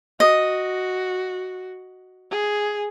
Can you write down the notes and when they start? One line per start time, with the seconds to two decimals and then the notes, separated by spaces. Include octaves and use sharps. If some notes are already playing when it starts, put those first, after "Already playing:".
0.20 F#4 D#5
2.31 G#4